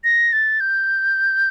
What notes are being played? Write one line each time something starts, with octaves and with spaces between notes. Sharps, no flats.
A#6
A6
G6